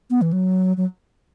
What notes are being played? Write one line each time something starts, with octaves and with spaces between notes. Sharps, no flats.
B3
E3
F#3
F#3